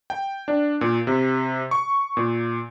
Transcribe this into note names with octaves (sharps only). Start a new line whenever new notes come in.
G5
D4
A#2
C3
C#6
A#2